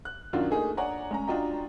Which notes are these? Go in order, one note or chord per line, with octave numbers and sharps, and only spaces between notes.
F#6
F#2 D#3 D4 F4 F#4
A3 A#3 D#4 G#4
D4 C#5 D5 F#5 G#5 A#5
G#3 C#4 A#5
D4 F4 F#4 D#5 G5 A#5